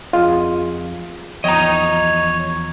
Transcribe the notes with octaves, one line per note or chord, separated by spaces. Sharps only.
F2 F4 G#4 D#5
E2 F3 C#5 D#5 G5 A#5